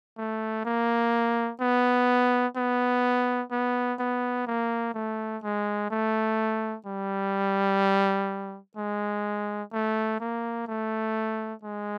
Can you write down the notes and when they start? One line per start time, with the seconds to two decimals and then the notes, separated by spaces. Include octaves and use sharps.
0.18 A3
0.65 A#3
1.61 B3
2.57 B3
3.51 B3
3.99 B3
4.47 A#3
4.94 A3
5.43 G#3
5.91 A3
6.86 G3
8.77 G#3
9.73 A3
10.20 A#3
10.68 A3
11.63 G#3